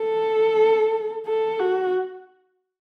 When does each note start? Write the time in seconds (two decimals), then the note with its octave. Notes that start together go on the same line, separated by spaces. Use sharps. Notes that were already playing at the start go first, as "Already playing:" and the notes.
Already playing: A4
1.26 A4
1.59 F#4